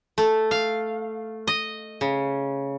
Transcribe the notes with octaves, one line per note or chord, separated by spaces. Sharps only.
A3
F5
D#5
C#3